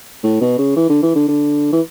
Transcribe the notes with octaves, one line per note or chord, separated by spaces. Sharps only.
A2
B2
C#3
E3
D3
E3
D3
D3
E3